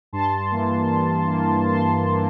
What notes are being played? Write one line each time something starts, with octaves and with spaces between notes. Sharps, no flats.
G2 A5 C6
E3 A#3
G2
E3 A#3
G2 A5 C6
E3
A#3